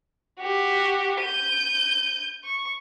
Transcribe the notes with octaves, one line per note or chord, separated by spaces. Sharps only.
F#4 G4
G6 D#7
C#6